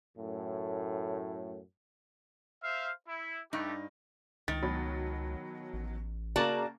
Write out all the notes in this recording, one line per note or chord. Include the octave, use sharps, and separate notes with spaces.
F#2 A2
C5 E5 F5
E4
G2 A3 D#4 G4
C#2 D#3 A6
B2 F#3 B5
A1
C#3 A#3 F#4 D5 A5 A#5